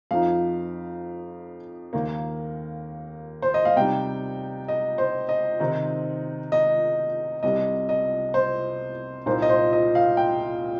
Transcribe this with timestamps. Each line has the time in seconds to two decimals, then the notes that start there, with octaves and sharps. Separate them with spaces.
0.11 F2 F3 D#4 F5
1.93 D#2 D#3 A#3
3.42 C5
3.54 D#5
3.65 F5
3.76 C3 G3 D#4 G5
4.68 D#5
4.98 C5
5.29 D#5
5.60 C3 D#3 C4 D#4
6.52 D#5
7.43 C2 C3 G3 D#5
7.89 D#5
8.34 C5
9.26 C2 A#2 A#3 D#4 C5
9.42 D#5
9.49 C5
9.73 D#5
9.95 F5
10.17 G5